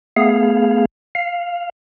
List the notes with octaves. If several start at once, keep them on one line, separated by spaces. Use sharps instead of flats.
A3 B3 G#4 F5
F5